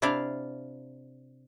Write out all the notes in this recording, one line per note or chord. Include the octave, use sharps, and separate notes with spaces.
C3 D4 E4 D5 F5